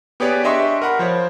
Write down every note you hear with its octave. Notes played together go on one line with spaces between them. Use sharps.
B3 G4 G#4 B4 C#5 D5
D4 G4 D#5 E5 C6 C#6
A#4 F#5 B5
F3 C5 C#5